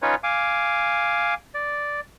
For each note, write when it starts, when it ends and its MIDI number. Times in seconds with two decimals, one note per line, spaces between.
0.02 0.15 61
0.02 0.15 63
0.02 0.15 65
0.02 0.15 71
0.02 0.15 73
0.23 1.34 77
0.23 1.34 80
0.23 1.34 86
1.54 2.00 74